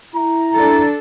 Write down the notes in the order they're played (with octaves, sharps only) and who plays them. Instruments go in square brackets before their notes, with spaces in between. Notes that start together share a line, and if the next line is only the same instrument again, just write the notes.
[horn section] E4 A#5
[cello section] D4 A4